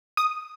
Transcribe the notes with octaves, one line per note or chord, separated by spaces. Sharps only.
D#6